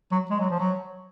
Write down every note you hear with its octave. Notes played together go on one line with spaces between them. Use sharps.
F#3
G#3
F#3
F3
F#3